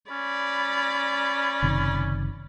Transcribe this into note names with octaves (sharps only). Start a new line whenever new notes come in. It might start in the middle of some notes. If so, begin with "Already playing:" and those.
C#4 D5 B5
F#1 C3 D#3